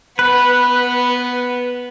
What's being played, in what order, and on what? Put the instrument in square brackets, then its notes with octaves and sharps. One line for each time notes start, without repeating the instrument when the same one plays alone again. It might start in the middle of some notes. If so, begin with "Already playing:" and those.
[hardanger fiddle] B3 [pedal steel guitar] B4